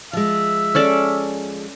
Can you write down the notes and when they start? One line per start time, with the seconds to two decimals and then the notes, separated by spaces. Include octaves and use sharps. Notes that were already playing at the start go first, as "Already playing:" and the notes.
0.13 F3 G#3 E5
0.75 C#4 A4 D5